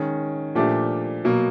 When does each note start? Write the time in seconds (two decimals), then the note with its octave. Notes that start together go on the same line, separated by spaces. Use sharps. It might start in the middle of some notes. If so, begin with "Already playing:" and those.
Already playing: D#3 G#3 C#4
0.55 A#2 F3 A3 D4 G4
1.24 B2 F#3 A#3